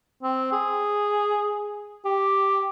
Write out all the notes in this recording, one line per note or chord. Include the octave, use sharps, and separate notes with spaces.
C4
G#4
G4